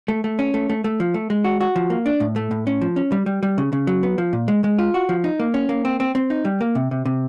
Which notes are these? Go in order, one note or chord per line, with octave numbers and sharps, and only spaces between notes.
A3
A3
C#4
A3
A3
A3
F3
A3
G#3
F#4
F#4
F3
A#3
D4
A2
A3
A2
C#4
F3
C#4
G3
G3
G3
C#3
C#3
F#3
B3
F3
A#2
G#3
G#3
F4
F#4
F3
D#4
A#3
C#4
A#3
C4
C4
C4
D#4
G3
A#3
C3
C3
C3